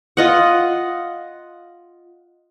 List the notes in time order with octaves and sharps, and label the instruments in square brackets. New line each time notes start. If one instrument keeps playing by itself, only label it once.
[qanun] F4 D#5 F#5